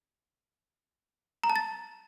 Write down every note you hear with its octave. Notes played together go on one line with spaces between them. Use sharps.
A#5
A5
A6